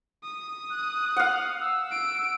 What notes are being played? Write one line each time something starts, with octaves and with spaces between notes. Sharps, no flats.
D#6
F#6
F5 F#5
E6
D7